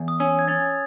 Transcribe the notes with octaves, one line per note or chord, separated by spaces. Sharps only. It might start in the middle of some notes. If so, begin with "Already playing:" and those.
Already playing: E2
D#6
C#4 E6
G#6
C#4 A6